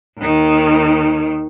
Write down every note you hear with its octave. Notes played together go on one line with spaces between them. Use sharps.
D#2 D#3